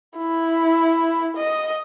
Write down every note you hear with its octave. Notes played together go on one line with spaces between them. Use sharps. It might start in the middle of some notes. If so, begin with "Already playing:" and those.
E4
D#5